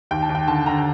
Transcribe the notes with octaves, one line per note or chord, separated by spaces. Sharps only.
D#2 G5
A5
D#2
G5
D3 A5
D3 A#5